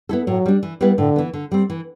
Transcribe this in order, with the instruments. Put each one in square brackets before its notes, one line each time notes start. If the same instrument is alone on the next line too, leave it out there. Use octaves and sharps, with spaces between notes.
[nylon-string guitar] B3 E4 A4
[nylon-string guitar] A2 [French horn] F#3
[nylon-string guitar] G3 D4
E3
G3 B3 E4 B4
[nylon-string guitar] A2 [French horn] D3
[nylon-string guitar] E3 B3
D3
G3 C4
E3